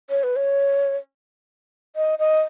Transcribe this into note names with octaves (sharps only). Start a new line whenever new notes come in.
C#5
B4
C#5
D#5
D#5